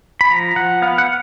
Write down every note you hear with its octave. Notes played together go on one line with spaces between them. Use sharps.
B5
F3 A#5
F3 F#5
B3 F5
F#5